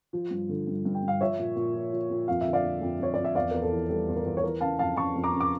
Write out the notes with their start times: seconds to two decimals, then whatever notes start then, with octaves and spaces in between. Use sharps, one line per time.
0.13 F3
0.31 G2
0.49 D3
0.67 G2
0.85 G2
0.95 G5
1.03 G2
1.08 F5
1.21 F3 C#5 E5
1.39 A#2
1.56 A#2
1.74 F3
1.92 F3
2.10 A#2
2.28 F2 F5
2.41 E5
2.47 D3
2.53 D5 F5
2.64 F2
2.81 F2
3.00 F2 C#5
3.14 F2 D5
3.24 E5
3.35 E2 D5 F5
3.51 E2 A#4
3.62 A4
3.71 E3
3.89 G3 A4
4.08 E2
4.16 A#4
4.26 E2
4.37 C#5
4.43 E3 A#4
4.61 C#3 F5 A5
4.79 F2 F5 A5
4.96 C#3 A5 C#6
5.15 F2
5.24 A#5 D6
5.33 C#3
5.41 D6